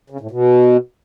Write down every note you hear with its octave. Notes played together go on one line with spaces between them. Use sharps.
C#3
A2
B2